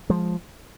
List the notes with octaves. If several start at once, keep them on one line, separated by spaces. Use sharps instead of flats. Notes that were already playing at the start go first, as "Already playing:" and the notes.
F3 G#3